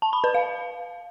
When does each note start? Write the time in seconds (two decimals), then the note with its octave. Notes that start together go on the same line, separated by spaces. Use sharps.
0.02 A5
0.13 B5
0.24 B4
0.34 F5